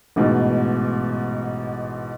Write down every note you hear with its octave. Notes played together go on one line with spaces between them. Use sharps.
A1 G#2 B2